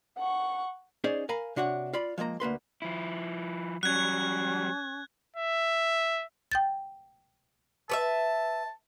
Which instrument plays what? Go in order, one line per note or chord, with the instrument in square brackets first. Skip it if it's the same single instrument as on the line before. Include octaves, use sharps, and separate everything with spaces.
[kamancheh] F#5 C#6
[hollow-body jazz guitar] C#4 D#4 G#4 C5 D5
A#4 F5 G#5 A#5 B5
C3 D4 F#4 C#5 F#5
F4 D5 B5
F3 G#3 A#3 A#5
D2 A#3 B4 C6
[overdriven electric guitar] F3 E4
[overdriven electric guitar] F#3 G3 [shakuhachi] C#4 [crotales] F#6 G#6
[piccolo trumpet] E5
[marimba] G5 G6 A6
[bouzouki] B4 C#5 E5 [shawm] A5